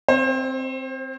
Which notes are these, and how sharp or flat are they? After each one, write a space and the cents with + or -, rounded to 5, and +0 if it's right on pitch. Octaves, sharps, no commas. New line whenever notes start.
C4 +0 C5 +35